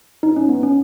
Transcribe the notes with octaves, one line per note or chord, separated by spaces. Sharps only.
D#4
C#4
B3
C#4